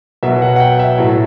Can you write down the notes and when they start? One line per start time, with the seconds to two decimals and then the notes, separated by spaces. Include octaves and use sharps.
0.23 B2 F#3 B3 E5
0.42 F#5
0.56 F#5
0.60 G5
0.79 E5
0.98 A2 F#3 A3